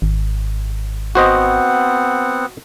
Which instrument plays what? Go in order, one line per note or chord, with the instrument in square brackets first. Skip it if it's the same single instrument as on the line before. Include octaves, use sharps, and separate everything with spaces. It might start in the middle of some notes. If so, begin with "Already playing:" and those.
[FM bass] G#1
[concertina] B3 C4 F#5 [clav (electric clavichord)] F#4 C5 D#5